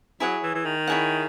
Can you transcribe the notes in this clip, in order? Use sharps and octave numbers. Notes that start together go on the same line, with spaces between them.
F#3 E4 G#4 C#5 F#5
E3
E3
D#3
E4 G#4 C#5 F#5